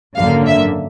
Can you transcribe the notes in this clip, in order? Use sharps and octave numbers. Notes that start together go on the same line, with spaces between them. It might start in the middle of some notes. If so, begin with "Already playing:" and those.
G#1 F#2 D3 F#3 A#3 F5
E5